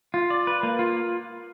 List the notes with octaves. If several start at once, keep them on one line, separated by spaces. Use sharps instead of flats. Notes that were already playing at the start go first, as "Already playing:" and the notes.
F4
D5
B4
A#3
F4